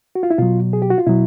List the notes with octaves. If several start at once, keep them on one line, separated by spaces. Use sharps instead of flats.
F#4
F4
E4
B2 F#3 F4
G#4
G4
F#4
F4
B2 F#3 E4